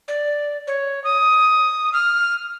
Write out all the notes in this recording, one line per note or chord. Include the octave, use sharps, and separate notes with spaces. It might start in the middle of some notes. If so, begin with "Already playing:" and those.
D5
C#5
D#6
F6